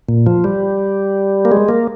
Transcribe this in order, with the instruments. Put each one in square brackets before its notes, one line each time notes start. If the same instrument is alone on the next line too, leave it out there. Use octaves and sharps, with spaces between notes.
[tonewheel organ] A#2
F3
G3
A#3
G#3
A#3